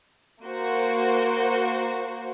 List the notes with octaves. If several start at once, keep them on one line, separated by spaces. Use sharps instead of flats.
A#3 F#4 C5